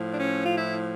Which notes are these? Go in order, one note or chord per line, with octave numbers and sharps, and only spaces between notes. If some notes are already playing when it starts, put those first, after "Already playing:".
Already playing: A2 F3
D4
C#4
F4
E4